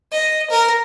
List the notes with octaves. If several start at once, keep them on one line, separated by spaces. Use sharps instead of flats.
D#5
A#4